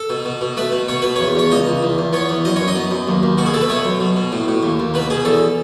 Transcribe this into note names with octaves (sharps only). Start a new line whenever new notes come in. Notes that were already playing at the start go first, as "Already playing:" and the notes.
Already playing: A4
B2
B2
B2
A3 B4
B2
B2 C#5
B2 B4
E2 C#5
E2 C#5
C#2 D#5
C#2
E2
E2
B3 C#5
E2
F#2 D#5
F#2 C#5
D#5
B3
F#2
D#2
D#2
B2 F#4
G#4
B2 A4
B4
A3 C#5
F#2
B2
B2
A2
A2
D#2
D#2
B2 B4
B2 G#4
E2 A4